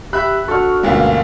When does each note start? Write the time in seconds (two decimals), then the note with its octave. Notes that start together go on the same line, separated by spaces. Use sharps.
0.13 G4 E5 B5 F#6
0.48 D4 F#4 A4 C#6 F6
0.83 D2 G2 B2 G#3 A#3 C#4 F4